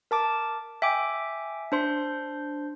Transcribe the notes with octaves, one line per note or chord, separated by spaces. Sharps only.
A#4 A5 D6
E5 G5 G#5 D6
D4 C5 C6